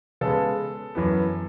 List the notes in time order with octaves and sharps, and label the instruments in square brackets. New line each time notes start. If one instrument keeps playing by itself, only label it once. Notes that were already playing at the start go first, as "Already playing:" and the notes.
[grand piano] C#3 G#3 B3 A4
F#2 E3 B3